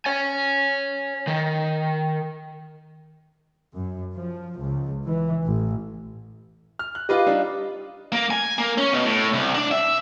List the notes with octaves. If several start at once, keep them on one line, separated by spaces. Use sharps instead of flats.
C#5 G#5
D#3
F#2
F3
C#2
E3
A1
F6
F#6
F4 G4 B4 D#5 F5
G3 D4 D#4
A#3
G#5
A#3
C#4
B2
A2
C2
D4
E5